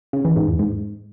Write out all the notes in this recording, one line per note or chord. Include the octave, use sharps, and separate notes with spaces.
C#3
E3
G#2
E2
G#2